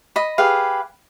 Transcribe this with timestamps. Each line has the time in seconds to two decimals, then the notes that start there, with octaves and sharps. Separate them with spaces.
0.16 D#5 B5
0.38 G4 G#4 B4 F5